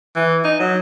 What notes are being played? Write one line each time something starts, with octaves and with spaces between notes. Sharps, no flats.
E3
D#4
F#3